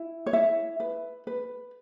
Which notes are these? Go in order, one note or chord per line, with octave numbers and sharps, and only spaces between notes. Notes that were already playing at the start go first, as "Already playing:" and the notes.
Already playing: E4
C#5
E4 E5
B4
B4